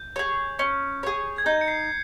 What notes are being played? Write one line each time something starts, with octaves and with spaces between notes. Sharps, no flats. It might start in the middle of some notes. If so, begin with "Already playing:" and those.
Already playing: G6
G#4 C#5
C#4
G#4 C#5
G#6
D#4 G6
C#7
C7